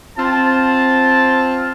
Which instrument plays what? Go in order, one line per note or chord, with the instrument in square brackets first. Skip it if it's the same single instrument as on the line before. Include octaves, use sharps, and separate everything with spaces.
[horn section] C4 F4 A5